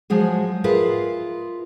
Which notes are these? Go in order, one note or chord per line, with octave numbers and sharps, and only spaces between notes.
F3 F#3 G#3 G#4
F4 G#4 A#4 B4 E5 F5